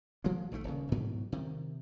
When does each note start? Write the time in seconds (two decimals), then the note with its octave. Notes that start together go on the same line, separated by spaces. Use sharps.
0.24 F3 G#3 A#3
0.52 A#1 D#3 E3 A3
0.64 D#1 D2 C#3
0.92 G#2 B2 E3 F#3
1.32 C3 D#3